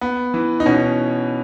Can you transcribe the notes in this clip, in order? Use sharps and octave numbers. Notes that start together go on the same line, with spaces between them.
B3
E3
D#4
B2 C#4